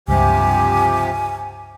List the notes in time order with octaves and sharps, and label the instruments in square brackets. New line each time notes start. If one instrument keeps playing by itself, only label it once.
[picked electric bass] C#2 G2 [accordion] C3 F3 G4 [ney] G#5